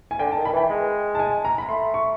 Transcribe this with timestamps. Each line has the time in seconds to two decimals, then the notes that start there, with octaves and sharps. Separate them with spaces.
0.11 G#5
0.19 D3 G5
0.32 A5
0.37 D#3
0.45 B5
0.53 E3 G5
0.70 G#3
1.15 A5
1.19 G#5
1.45 A#5
1.58 B5
1.69 A3 C6
1.94 C#6